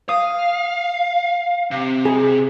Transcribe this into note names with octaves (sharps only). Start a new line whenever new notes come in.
F5 D#6
C3
G#4